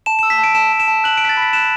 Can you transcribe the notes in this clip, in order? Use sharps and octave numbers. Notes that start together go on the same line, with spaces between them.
A5 E7
E7
E6
B6
A5
D7
A5 E7
A5
E7
A5
F#6 F#7
D7
F#6 B6
A6
B5 B6
F#6 E7